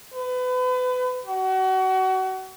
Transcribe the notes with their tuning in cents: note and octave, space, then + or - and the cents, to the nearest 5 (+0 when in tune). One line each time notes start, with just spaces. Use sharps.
B4 +30
F#4 +30